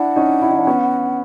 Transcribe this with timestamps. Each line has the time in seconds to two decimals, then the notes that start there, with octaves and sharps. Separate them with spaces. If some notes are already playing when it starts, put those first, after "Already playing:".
Already playing: D4 E4 F#5
0.16 C#4 D#4
0.42 E4
0.51 D#4
0.58 D4
0.67 B3 C#4